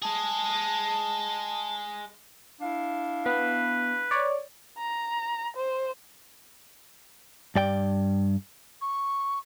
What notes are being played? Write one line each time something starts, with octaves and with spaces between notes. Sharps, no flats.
G#3 G#4 A5
D4 E4 F5
B3 B4
C#5 D5
A#5
C5
G2 D5 G5
C#6